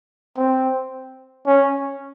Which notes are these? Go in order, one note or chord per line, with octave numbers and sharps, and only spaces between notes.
C4
C#4